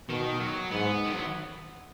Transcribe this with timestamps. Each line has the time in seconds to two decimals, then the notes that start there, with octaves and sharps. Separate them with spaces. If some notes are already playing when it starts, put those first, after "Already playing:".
0.09 B2 D#3
0.40 F#3
0.71 G#2 B3
1.06 D#3
1.14 F#3